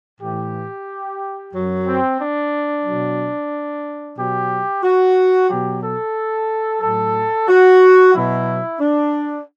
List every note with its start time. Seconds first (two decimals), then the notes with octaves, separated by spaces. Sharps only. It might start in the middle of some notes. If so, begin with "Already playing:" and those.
0.21 A2 E3 G4
1.53 F#2 F#3
1.86 C4
2.19 D4
2.85 B2 F#3
4.17 B2 F#3 G4
4.83 F#4
5.49 B2 F#3 G4
5.83 A4
6.81 A2 F#3 A4
7.48 F#4
8.14 B2 F#3 E4
8.80 D4